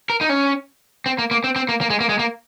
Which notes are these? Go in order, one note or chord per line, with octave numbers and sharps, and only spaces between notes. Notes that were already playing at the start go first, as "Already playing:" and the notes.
A#4
D#4
C#4
C4
A#3
A#3
C4
C4
A#3
A#3
G#3
A#3
G#3
A#3